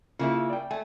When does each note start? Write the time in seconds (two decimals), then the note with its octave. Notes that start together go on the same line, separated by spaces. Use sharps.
0.19 C#3 A#3 E4 F4
0.49 D5 G5
0.71 A3 G#5